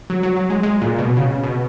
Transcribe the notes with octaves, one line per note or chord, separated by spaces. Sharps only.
F#3
F#3
F#3
G#3
G#3
A#2
B2
C#3
B2